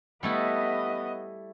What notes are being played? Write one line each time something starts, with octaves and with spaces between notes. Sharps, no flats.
G3 A3 B3 E4 D#5